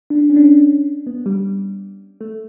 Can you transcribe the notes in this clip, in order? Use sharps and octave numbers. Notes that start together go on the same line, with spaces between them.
D4
C#4
D4
C#4
B3
G3
A3